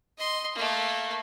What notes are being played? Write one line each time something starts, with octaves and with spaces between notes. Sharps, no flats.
D#5 C6
A3 A#3